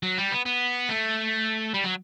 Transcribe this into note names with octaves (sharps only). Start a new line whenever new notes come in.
F#3
G3
B3
B3
A3
G3
F#3